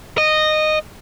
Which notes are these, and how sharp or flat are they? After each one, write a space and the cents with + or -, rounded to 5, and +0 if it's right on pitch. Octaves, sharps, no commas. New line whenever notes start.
D#5 -15